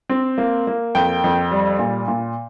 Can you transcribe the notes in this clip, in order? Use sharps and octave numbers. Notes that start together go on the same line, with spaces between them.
C4
A#3
A#3
F2 G5
F2
G3
A#2
A#2